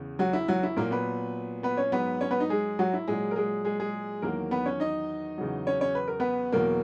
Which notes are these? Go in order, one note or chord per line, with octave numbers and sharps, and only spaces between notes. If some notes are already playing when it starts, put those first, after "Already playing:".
Already playing: E2 C#3
F#3 F#4
E4
F#3 F#4
E4
A#2 F#3 A#3 A#4
B3 B4
B3 B4
C#4 C#5
G#2 F#3 B3 B4
C#4 C#5
B3 B4
D#4
G#3 G#4
F#3 F#4
E4
A#2 F#3 G#3 G#4
A#4
G#3 G#4
G#3 G#4
G#3 G#4
E2 D#3 F#3 A#3 A#4
B3 B4
C#4 C#5
D#4 D#5
E2 C#3 F#3
C#4 C#5
C#4 C#5
B4
A#4
B3 B4
E2 B2 F#3 A#3 A#4